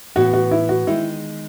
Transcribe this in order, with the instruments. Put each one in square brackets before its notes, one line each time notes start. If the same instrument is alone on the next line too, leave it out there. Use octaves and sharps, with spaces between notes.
[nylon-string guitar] A2 E3 B3 [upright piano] F#4
[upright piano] F#4
E4
F#4
[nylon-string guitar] D#3 G#3 D#4 [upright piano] E4